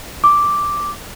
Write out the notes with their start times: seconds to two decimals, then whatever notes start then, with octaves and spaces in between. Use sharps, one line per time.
0.24 D6